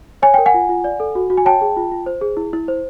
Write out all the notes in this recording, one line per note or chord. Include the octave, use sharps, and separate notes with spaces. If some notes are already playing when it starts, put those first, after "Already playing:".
C#5 G#5
A#4 G5
F#5 G#5
F4
F4
D5
A4
F#4
F#4
G#5
C#5 G5 A5
G#4
F4
F4
C5
G#4
E4
E4
C5